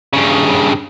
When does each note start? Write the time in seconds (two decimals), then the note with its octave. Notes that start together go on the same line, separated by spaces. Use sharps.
0.13 G2 C#3